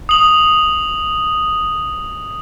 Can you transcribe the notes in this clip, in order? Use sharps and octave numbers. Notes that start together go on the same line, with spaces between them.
D#6 F#7